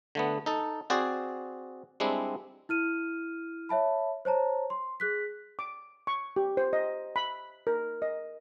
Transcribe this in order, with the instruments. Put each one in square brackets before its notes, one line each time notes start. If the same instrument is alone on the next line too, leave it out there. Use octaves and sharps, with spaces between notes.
[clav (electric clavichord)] D3 A3 B3
D#4 A4
C4 F#4 G#4 C5 D5
G3 G#3 C4 D4 E4
[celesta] E4 F6 D#7
C#5 E5 A5 B5
C5 C#5 A5 A#5
C6
G#4 F#6 B6
[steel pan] D6
C#6
G4
C5
D#5
B5
A#4
D#5